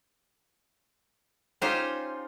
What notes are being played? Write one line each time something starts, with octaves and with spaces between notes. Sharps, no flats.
C#4 D#4 F4 G4 C5